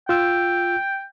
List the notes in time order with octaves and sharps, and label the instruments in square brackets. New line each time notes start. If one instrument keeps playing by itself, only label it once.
[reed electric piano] F4 E6 [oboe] G5